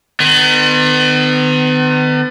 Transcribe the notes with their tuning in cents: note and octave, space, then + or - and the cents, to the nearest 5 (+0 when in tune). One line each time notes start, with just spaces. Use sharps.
D#3 -40 B3 +35